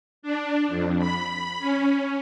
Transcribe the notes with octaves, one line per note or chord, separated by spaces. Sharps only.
D4
F2
B5
C#4